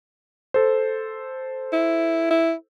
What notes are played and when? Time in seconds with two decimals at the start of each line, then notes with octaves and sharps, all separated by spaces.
0.54 A4 C5
1.73 E4
2.31 E4